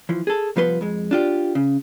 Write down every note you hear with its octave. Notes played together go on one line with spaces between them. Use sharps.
E3 F3
G#4 A4
C2 F3 B3 B4 C6
F2 G#3
D4 F4 G4
C#3